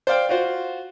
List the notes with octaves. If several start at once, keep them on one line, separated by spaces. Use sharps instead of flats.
C5 D5 F5 G5
F4 F#4 C5